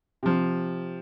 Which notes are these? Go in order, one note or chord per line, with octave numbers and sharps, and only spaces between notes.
C3 F3